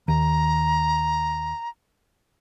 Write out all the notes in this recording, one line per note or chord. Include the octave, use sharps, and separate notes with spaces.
D#2 A#5